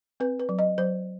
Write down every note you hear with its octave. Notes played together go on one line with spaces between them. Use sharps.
C4 B4
B4
F#3
D#5
F#3 C5